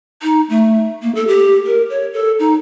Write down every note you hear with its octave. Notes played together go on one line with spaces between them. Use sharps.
D#4
A3
A#3
A4
G4
A#4
C#5
A4
D#4